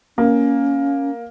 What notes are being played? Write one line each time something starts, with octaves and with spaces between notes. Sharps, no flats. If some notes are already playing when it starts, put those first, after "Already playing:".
A#3 C#4